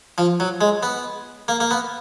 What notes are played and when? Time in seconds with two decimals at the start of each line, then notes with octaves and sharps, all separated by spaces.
0.18 F3
0.40 F#3
0.61 G#3
0.83 B3
1.48 A#3
1.60 A#3
1.71 B3